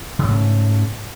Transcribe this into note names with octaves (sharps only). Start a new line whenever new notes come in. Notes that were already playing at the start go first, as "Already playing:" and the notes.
G#2 C#3 A3 C#4